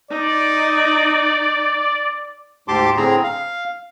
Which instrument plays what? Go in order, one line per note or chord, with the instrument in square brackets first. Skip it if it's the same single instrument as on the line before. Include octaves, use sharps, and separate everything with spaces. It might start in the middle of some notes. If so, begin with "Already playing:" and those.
[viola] D#4 [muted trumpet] D5
[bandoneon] D2 G#2 G4 A5 C6 D6
A2 D3 C4 G#4 A#5
F5